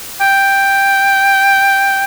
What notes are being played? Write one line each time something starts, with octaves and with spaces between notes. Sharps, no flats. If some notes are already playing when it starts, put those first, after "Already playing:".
G5